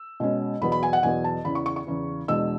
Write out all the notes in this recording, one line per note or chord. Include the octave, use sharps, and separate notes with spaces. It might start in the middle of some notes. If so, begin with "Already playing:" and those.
Already playing: E6
B2 G#3 C#4
E2 B2 F#3 B3 B5
B5
G#5
F#5
E2 B2 F#3 B3 G#5
A5
E2 C#3 E3 B5
C#6
C#6
C#6
E2 C#3 E3
E2 B2 G#3 D4 E6